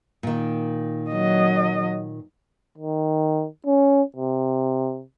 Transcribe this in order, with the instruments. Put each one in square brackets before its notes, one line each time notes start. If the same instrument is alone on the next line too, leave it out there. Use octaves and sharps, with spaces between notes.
[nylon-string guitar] A#2 D#3
[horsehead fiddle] F#3 D#5
[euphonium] D#3
C#4
C3